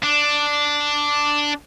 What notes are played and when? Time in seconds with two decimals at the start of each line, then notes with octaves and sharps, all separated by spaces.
0.03 D4